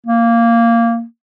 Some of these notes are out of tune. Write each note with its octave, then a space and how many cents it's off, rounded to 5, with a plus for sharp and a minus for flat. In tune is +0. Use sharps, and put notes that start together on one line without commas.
A#3 -10